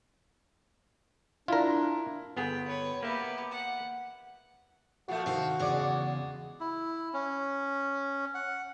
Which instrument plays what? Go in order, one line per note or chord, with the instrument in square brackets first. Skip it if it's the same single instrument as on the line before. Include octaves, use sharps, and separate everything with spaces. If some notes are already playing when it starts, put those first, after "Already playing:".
[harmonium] D4 [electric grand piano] E4 [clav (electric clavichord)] F4 A#4
[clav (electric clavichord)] G1 B3 G#4 [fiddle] G5
[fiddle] B4 C#5
[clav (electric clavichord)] A#3 E5 [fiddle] B3 G4
[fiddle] F#5
[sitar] A#2 F3 A3 [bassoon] F#4
[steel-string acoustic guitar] C3 D#3 F5 [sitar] C4
[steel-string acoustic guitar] E2 C#3 [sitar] G#3 D5
[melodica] E4
C#4
F#5